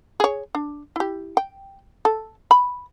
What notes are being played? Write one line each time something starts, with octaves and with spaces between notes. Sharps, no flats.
G#4 C#5
D4
E4 G4
G5
A4
B5